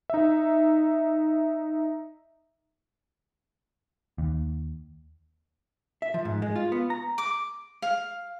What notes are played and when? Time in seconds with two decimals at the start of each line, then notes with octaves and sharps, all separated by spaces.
0.10 D#4 E5
4.18 D#2
6.02 E5
6.14 F3
6.25 G#2
6.42 G#3
6.56 F4
6.72 B3
6.90 A#5
7.18 D6
7.82 F5